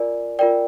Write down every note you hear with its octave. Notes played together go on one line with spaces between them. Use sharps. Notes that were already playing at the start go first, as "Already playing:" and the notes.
Already playing: F4 A#4 D5 G#5
F4 A#4 D5 G5